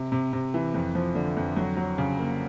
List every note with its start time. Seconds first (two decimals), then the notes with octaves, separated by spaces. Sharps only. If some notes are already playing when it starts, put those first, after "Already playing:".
Already playing: C3
0.12 C3
0.33 C3
0.54 E3
0.74 F2
0.95 F3
1.15 D3
1.37 F2
1.56 F#3
1.77 F#3
1.98 C#3
2.19 A#3